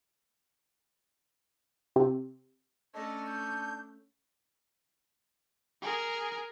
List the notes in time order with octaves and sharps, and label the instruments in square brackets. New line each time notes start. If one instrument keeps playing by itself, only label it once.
[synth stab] C3
[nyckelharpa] A3 C#4 [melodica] D4 [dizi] D#5
[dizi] G6
[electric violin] G#4 A#4